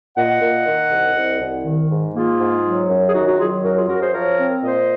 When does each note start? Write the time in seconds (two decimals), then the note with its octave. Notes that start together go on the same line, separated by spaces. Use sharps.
0.17 A#2 D#5 F#5
0.42 A#2
0.66 D#3
0.91 C2
1.16 C2
1.40 C2
1.65 D#3
1.90 G#2
2.15 A#3 F4 G#4
2.40 G#2
2.65 F#3
2.89 F#2
3.08 G#4
3.14 D#3 D#4 F#4
3.27 D#4 F#4
3.39 F#3 F4 G#4
3.64 F#2 F#4 A#4
3.76 F4 G#4
3.88 F#2 F#4 A#4
4.01 G#4 C5
4.13 F3 A#4 C#5
4.38 C4
4.63 A#2 C5 D#5